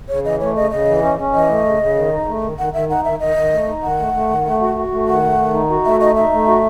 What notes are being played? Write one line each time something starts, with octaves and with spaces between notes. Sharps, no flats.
C#3 C#5
E3 D#5
A3 C#5
C#3 D#5
C#3 D#5
E3
C#4
C#4
E3 D#5
A3
C#3
C#3
D#3
D#4
A3
D#3
D#3 F#5
D#3 E5
D#4 F#5
D#3 E5
D#3 D#5
D#3
A3
D#4
D#3 F#5
A3
A3
D#3
A3
F#4
F#4
A3
D#3 F#5
A3
D#3
D#4
F#4
A3 E5
D#4 D#5
D#4 E5
A3
F#4